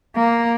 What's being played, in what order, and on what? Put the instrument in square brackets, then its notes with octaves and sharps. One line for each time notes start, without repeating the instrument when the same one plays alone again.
[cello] A#3